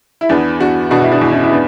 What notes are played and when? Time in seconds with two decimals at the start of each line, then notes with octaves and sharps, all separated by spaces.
0.21 E4
0.29 E2 B3 D4
0.60 E2 D4 F#4
0.91 B2 D4 F#4
1.02 E4
1.12 D4 F#4
1.21 E2
1.32 C#4 E4
1.43 E4
1.53 B3 D4